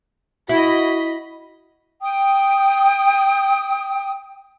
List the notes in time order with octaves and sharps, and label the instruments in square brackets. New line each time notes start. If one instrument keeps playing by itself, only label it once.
[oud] E4 [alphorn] F#4 [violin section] D#5 B5 B6
[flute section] G5 D#6